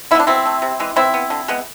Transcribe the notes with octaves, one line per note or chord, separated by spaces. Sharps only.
G#3 B3 D4 E4
B2 C4 E4
A3
C3
E3 G#3
E3 C4 E4
B3
D3
G#3 B3